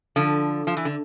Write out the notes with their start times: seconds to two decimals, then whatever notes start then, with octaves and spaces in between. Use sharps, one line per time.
0.16 D3 F3
0.67 F3
0.77 E3
0.85 D3